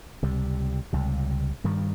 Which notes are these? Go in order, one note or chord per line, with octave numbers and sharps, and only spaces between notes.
C#2 C3 G3
C#2 C3 G3
G2 D#3 G3